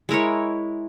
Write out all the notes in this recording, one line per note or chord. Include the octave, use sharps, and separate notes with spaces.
G#3 E4 A#4 C#5